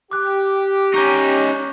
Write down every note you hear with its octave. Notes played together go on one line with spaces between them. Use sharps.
G4 D6 F#6
C#4 D#4 C#6 G6